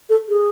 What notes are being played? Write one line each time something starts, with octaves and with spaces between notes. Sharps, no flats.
A4
G#4